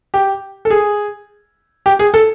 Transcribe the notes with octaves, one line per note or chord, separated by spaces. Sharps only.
G4
A4
G#4
G4
G#4
A4